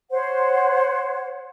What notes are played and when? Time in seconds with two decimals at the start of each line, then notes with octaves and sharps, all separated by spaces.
0.11 C5 C#5 F#5